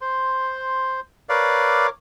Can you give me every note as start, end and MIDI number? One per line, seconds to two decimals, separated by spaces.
0.01 1.00 72
0.01 1.00 84
1.29 1.89 70
1.29 1.87 71
1.29 1.89 73
1.29 1.87 74
1.29 1.87 77
1.29 1.89 86